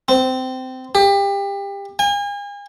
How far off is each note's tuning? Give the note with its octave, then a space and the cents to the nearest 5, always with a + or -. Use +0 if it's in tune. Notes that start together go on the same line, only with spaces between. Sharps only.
C4 -20
G4 +25
G#5 -40